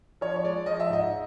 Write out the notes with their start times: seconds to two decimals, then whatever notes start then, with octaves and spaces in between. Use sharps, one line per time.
0.21 F3 C#5
0.36 C#5
0.43 G#3 D5
0.66 F3 D#5
0.80 E5
0.90 G#2 D#5